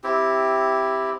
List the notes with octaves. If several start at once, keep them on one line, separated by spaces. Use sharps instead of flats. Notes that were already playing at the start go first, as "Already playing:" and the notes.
C4 E4 G4